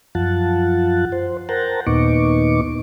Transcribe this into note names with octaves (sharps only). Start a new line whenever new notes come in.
F#2 F3 F4 F#5 A5
C5
A#4 C5 F#5 G5 A5 A#5
D#2 A#2 B3 D#4 C#6 D6